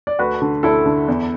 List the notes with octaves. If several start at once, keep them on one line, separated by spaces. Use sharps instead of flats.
D5
D2 F#4 B4
D3
D2 E4 A4
D3
E2